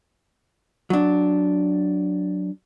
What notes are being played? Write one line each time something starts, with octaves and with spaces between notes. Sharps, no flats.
F#3 D4